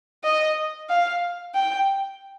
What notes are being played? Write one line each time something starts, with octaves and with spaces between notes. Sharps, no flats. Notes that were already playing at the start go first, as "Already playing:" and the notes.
D#5
F5
G5